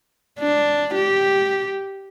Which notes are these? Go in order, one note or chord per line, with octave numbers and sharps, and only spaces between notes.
D4
G4